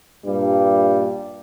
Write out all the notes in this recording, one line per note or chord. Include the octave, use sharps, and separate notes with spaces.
G2 A#2 G3